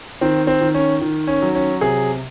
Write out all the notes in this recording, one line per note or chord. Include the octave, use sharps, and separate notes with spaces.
D#3 C4
C4
D#3
C#4
D#3
C#4
F#3
C#4
C3 G#4